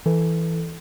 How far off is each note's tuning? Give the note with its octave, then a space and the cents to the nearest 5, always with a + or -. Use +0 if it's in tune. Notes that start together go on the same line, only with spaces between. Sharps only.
E3 +0 A4 +0